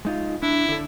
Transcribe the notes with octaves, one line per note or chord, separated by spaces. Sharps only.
G#3 D#4 F4
D4 E4
D3 A4